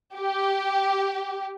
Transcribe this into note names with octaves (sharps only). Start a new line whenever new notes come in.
G4